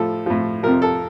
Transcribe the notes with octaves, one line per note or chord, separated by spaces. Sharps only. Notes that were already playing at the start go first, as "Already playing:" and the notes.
Already playing: A2 F3 A4
A2 F3
F2 C3 F3 A#4
A4